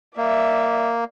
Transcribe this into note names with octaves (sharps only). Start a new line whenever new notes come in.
A#3 D5 E5